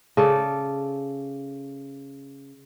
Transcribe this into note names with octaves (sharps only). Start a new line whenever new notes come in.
C#3 A4 D5